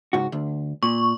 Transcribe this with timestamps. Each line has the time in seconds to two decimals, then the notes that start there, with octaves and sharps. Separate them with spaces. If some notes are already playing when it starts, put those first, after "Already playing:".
0.13 C#2 G#2 F#4
0.32 D2
0.83 A#2 C#6